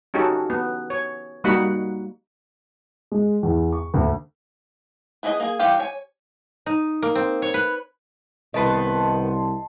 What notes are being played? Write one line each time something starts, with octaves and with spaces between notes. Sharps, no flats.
C#4 D#4 F#4 G4 A4
B3
C#5
G3 A#3 D#4 F#4 F#5 B5
G#3
E2
C#6
D2
B3 E4 G#4 C5 D#5
A#3 G#4
E3 G3 F4 G4 F5
C#5 G#5
D#4
A#3
C4
C#5
B4
C2 D#3 B3 D#5 A5 C6